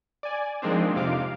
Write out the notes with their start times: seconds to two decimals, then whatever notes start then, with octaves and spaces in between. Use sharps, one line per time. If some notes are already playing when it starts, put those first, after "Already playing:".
0.23 D5 G#5
0.62 D#3 F3 G#3 A#3 C4 D4
0.96 F2 C3 F5 D6